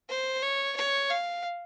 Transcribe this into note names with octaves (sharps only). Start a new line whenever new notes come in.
C5
C#5
C#5
F5